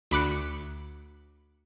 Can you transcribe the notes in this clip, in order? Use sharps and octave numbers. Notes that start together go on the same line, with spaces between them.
D2 B5 D6 F#6 C#7